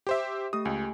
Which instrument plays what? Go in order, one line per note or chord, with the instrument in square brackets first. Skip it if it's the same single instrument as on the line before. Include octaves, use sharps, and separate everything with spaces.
[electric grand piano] G4 C5 E5
[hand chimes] A3 G4 [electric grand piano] D#6
[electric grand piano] C#2 [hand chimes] G#5